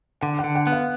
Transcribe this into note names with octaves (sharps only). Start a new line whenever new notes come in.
D3 F#5
F#5
D3
F#5
B3
F5